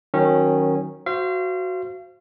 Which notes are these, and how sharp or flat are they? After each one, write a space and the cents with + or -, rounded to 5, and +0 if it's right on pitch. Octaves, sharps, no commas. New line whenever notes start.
D#3 +0 F#3 +0 C#4 -20
F#4 +0 C5 +0 F5 -35